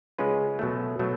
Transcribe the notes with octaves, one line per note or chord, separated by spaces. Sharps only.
C#3 G#3 C#4 F4 B4
B2 F#3 A3
B2 F#3 A3